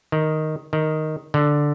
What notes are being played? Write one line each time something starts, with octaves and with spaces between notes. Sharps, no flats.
D#3
D#3
D3